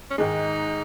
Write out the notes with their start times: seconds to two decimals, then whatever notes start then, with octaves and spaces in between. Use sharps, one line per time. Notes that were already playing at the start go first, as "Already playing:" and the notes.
0.10 C#4
0.18 G#2 D#3 G#3 D#4